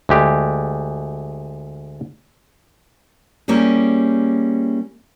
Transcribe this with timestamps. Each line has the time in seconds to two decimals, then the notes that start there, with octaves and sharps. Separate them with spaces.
0.09 D2 G#3 G4
3.48 G3 A#3 C#4 E4 G4 G#4